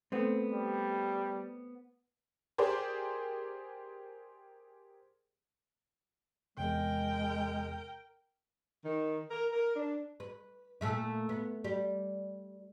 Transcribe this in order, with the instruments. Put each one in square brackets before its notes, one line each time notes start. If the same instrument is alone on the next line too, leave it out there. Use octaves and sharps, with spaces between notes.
[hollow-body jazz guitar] A3 B3 C4
[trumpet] G3
[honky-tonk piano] G4 G#4 A#4 C5 D5
[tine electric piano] E2 C3 [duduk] G#3 [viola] A#4 G5
[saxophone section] D#3
A#4
A#4
D4
[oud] B4
A#2 A3 E4
B3
G3